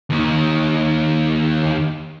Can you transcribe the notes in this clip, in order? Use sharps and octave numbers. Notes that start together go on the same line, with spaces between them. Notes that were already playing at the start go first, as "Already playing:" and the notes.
D#2 D#3